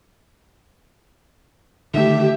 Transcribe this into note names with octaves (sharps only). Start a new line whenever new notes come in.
D3 D#3 A3 G4 E5